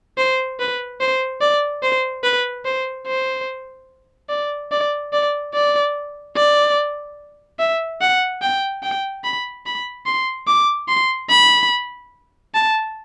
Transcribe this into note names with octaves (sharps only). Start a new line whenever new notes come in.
C5
B4
C5
D5
C5
B4
C5
C5
D5
D5
D5
D5
D5
E5
F#5
G5
G5
B5
B5
C6
D6
C6
B5
A5